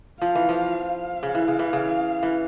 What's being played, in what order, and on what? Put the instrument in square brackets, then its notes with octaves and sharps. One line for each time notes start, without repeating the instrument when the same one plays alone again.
[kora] F3 [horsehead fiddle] F5
[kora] E3
F3
[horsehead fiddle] F5
[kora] C#3
E3
C#3
E3
C#3
E3